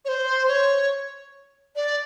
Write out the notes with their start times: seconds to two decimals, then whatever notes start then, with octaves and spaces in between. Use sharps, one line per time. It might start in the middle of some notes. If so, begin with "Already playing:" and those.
0.05 C#5
0.09 C5
0.48 C#5
1.76 D5